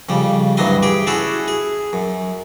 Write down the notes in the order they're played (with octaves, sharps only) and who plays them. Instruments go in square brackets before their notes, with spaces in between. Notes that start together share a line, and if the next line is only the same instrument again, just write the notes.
[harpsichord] F2 C#3 G3
D2 G2 E3 F#3 D#5 C6
G4 G#4 G5
C#4 E4 F#4 G#4 A4
G#4
F#2